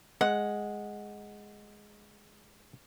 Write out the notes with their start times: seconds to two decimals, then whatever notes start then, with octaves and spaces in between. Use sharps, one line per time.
0.21 G#3 F#5